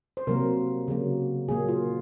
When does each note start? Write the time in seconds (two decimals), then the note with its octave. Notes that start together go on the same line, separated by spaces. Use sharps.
0.17 C5
0.27 C3 F#3 A#3 A#4
0.88 C#3 F#3 A#3
1.48 A#2 F#3 A#3 G#4
1.68 F4